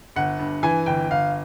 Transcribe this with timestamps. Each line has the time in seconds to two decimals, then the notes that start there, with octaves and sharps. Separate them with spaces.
0.16 G1 F#5
0.39 G2
0.63 E3 G#5
0.86 G1 G5
1.11 G1 F5